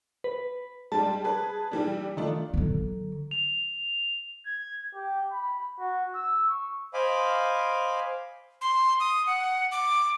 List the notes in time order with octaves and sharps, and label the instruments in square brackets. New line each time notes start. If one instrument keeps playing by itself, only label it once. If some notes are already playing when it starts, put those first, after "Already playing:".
[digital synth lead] B4
[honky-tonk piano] G3 G#3 D4 [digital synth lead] A5
[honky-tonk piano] G#4 B4
E3 G3 D4
[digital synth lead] D#3 [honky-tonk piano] A3 D4 F4
[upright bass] D3 F#3
[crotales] F7
[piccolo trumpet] G#6
G4
B5
F#4
E6
C#6
[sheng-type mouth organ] C5 D#5 F5 G#5 B5 D6
[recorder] C6
D#6
F#5
D6